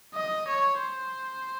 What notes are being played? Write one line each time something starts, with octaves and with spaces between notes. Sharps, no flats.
D#5
C#5
C5